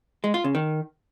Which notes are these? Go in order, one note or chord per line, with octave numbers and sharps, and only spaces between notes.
G#3
F4
C#3
D#3